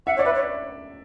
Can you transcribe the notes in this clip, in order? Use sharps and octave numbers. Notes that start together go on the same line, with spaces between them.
E5 F#5
C#5
D5
B4 E5
C#5